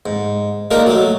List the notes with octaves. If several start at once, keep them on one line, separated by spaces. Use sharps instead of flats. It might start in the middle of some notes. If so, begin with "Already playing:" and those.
G#2
G#3 A#3 D4 D#4 A#4
F#3 A3